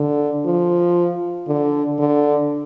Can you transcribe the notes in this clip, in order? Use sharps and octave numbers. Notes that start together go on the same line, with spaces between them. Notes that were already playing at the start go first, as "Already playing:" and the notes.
Already playing: D3
F3
D3
D3